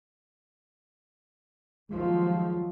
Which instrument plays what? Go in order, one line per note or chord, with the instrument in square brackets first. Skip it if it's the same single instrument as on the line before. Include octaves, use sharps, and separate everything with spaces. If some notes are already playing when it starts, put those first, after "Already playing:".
[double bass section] D#2 F3 F#3 [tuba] G#3